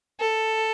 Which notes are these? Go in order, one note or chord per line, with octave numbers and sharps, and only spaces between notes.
A4